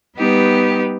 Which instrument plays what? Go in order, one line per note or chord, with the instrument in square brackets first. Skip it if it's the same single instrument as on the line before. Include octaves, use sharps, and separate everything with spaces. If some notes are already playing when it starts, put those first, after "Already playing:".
[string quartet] G3 B3 D#4 G4 B4